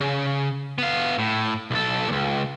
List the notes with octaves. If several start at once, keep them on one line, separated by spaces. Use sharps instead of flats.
C#3
B3 F5
A2
B1 A4
C#2 A#2